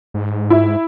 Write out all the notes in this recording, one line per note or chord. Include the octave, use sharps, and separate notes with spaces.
G#2
E4